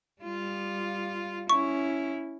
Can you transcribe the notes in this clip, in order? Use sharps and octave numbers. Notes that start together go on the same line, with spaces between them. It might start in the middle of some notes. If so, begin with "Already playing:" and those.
G3 F4
C#4 E4 C#6